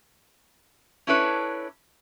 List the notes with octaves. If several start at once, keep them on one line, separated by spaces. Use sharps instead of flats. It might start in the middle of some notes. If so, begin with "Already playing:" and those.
C#4 D4 E4 A4 B4 C#5